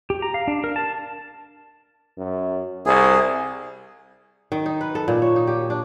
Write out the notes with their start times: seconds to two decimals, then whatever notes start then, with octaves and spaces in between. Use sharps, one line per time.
0.10 G4
0.22 A#5
0.34 F5
0.48 D4
0.64 A#4
0.76 A5
2.18 F#2
2.86 C2 G#4
4.52 D#3
4.66 D#4
4.81 B4
4.95 A4
5.08 A#2
5.22 C#5
5.36 D#4
5.47 G4
5.70 D4